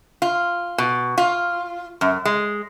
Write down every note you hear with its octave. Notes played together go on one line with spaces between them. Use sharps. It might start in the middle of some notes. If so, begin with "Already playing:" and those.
F4
B2
F4
F#2
G#3